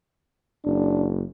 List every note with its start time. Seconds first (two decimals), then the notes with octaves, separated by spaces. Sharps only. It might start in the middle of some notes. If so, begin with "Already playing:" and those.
0.65 F#1 D4